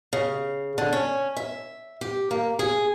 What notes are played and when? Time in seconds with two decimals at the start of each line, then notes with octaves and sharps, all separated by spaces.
0.13 C#3
0.78 D3
0.93 C#4
1.37 E5
2.01 G4
2.31 A#3
2.59 G#4